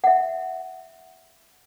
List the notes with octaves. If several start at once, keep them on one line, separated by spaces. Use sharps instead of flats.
E5 F#5